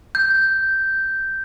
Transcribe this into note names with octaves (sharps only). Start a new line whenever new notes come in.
G6